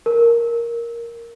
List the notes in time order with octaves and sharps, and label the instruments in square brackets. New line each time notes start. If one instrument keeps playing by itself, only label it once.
[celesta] A#4